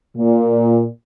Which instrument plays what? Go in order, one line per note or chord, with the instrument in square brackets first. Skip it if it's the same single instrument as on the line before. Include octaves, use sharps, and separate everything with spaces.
[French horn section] A#2